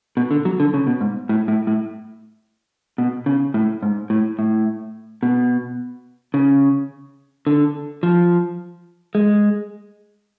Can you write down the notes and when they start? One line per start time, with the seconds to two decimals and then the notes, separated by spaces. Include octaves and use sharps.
0.17 B2
0.31 D3
0.45 F#3
0.60 D3
0.74 C#3
0.87 B2
1.01 G#2
1.29 A2
1.48 A2
1.67 A2
2.98 B2
3.26 C#3
3.54 A2
3.83 G#2
4.10 A2
4.39 A2
5.23 B2
6.34 C#3
7.47 D3
8.03 F3
9.15 G#3